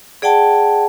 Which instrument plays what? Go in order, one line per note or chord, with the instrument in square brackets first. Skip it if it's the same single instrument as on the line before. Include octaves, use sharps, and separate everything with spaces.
[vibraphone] G#4 D5 F#5 G5 A5